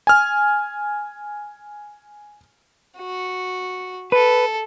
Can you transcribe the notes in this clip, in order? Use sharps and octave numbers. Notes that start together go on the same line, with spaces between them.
G#5 F6
F#4
A4 B4